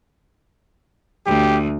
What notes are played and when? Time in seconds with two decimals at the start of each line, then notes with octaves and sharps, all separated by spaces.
1.27 D2 G4